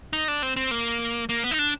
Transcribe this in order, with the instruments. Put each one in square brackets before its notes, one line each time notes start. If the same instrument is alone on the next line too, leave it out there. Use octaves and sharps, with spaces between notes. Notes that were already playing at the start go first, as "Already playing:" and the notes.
[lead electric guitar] D#4
D4
C4
C4
A#3
A#3
B3
D#4
D4